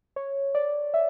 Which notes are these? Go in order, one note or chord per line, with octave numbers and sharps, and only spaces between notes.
C#5
D5
E5